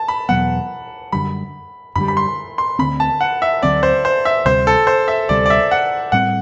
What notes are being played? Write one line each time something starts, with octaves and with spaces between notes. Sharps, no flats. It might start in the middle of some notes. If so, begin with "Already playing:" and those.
Already playing: A5
B5
E2 B2 F#3 B3 F#5
F#2 D3 G3 B5
F#2 D3 G3 B5
B5
C6
C6
D2 D3 F#3 C4 B5
A5
F#5
E5
D2 D3 F#3 C4 D5
C5
C5
E5
D2 C3 G3 C5
A4
C5
E5
D2 C3 G3 D5
D5
E5
F#5
A2 G3 C4 F#5